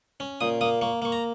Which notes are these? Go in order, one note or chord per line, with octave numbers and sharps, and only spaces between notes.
C#4
A#2 D#6
A#3 D#6
A#3 C#6
A#3 C#6
A#5